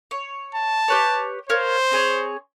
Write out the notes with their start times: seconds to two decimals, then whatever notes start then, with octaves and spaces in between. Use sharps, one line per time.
0.11 C#5
0.55 A5
0.88 G4 B4 C#5
1.49 A#4 C5 C#5 F5
1.91 C4 G#4 C#5